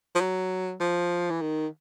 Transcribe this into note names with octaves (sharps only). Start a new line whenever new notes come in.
F3
F#3
F3
E3
D#3